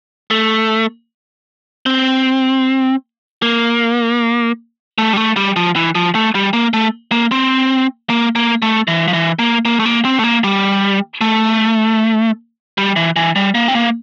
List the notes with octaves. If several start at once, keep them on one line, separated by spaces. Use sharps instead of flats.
A3
C4
A#3
A3
G3
A3
G3
F3
E3
F3
A3
G3
A#3
A3
A#3
C4
A#3
A#3
A3
E3
F3
E3
A#3
A#3
A3
A#3
C4
A3
A#3
G3
A3
G3
E3
E3
G3
A#3
C4
A#3